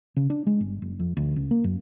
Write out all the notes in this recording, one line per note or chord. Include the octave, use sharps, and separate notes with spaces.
C#3
D4
G#3
G1
F#1
F2
D2
C#2
A#3
F#2